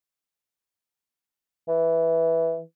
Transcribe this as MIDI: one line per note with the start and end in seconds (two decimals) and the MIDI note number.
1.68 2.61 52